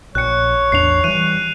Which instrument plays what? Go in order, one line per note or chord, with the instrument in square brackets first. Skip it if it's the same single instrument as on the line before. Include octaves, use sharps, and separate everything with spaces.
[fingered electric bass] A#1 [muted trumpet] C#5 [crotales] F#6 C#7
[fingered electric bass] A1 E2 D4 [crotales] C7 F7
[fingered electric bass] E3 G3 [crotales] F#6 D#7